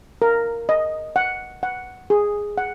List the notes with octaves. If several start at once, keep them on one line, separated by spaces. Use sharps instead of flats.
A#4
D#5
F#5
F#5
G#4
F#5